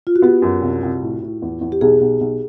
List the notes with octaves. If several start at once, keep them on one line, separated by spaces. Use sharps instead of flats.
F4
F#4
B3 G4
F#2
C2
C2
A2
A2
E2
E2
G4
B1 G#4
B1
B1